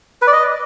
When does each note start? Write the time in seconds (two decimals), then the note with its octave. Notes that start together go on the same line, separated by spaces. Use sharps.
0.22 B4
0.27 D5
0.33 D#5